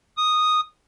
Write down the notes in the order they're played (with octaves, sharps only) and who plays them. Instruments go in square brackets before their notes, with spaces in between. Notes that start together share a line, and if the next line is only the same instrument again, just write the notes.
[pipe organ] D#6